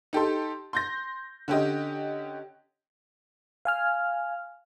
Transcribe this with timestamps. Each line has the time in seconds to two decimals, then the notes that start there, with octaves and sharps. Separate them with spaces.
0.13 D#4 G4 A4 C6
0.73 C6 G6 A#6
1.48 D3 C#4 G4 D#5
3.65 F5 G#5 F6